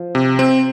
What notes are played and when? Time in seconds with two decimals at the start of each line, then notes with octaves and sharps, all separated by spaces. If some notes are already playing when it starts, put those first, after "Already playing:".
Already playing: F3
0.15 C3
0.39 C4